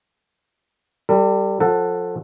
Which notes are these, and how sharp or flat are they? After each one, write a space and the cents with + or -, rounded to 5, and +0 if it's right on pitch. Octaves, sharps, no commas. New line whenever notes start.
G3 +0 A4 +40
F3 +25 A4 +10 F#5 +0